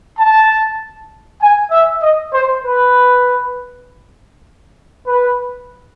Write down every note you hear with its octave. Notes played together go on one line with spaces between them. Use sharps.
A5
G#5
E5
D#5
C5
B4
B4